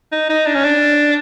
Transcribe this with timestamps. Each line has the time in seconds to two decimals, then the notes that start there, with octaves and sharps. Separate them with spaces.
0.12 D#4
0.29 D#4
0.46 D4
0.55 C#4
0.64 D4